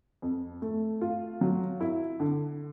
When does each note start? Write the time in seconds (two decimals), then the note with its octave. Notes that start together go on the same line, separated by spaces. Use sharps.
0.22 F2
0.62 A3
1.01 F4
1.41 F#3
1.80 E4
2.20 D3